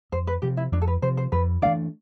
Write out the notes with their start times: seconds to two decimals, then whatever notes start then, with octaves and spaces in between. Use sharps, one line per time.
0.12 F2 C5
0.27 B4
0.42 C3 F3 G4
0.57 E4
0.72 F2 D4
0.82 A4
0.87 B4
1.02 C3 F3 C5
1.17 C5
1.32 F2 B4
1.62 E3 A3 D4 D5 F5